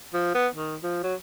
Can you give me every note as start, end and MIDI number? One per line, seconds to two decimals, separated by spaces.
0.14 0.33 53
0.35 0.48 59
0.55 0.76 51
0.83 1.02 53
1.03 1.15 54